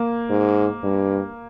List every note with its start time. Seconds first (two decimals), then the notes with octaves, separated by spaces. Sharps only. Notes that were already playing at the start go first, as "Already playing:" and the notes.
Already playing: A#3
0.30 G#2
0.83 G2